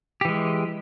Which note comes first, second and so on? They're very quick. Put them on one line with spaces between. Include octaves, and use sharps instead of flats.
G4 E3 G#3